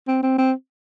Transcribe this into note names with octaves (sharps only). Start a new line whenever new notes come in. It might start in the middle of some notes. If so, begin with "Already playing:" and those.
C4
C4
C4